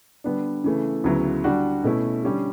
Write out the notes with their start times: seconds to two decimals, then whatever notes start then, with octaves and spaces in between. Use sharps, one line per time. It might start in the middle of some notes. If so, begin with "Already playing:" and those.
0.24 D3 G3 B3 D4
0.64 C#3 E3 A3
1.04 D2 C#3 F#3 B3 E4
1.44 D3 G3 D4 F#4
1.84 B2 A3 C#4 E4
2.24 D3 G3 C#4 G4